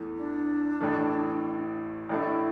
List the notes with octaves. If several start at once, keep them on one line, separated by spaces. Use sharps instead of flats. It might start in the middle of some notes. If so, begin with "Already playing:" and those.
Already playing: E2 E3 A3
D4
A1 A2 E3 A3
A1 A2 A3 D4 E4